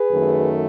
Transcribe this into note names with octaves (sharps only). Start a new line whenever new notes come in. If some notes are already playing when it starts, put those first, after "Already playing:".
Already playing: G#4 B4
F#2 D#3 A3